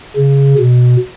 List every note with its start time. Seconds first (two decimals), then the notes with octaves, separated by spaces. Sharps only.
0.17 C#3
0.58 B2